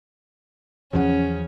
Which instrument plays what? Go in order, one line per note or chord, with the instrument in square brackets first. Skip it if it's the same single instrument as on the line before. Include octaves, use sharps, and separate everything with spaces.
[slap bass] E2 F3 F#3 [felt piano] C#3 F#5 [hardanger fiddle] C#4